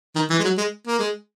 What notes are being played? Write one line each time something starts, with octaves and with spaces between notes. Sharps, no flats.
D#3
E3
G#3
F#3
G#3
A#3
G#3